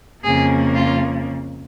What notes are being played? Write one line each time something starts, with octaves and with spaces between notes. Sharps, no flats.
F2 C#3 A#3 G#4
F4